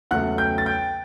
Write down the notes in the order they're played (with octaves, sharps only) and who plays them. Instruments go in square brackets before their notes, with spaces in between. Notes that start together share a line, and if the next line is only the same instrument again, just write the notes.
[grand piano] E2 C#3 F#3 A3 F#5 F#6
G5 G6
A6
G5 G6